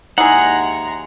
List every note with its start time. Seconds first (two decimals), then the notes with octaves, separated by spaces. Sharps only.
0.18 D#2 G#3 D#4 E4 G#4 F#5 A#5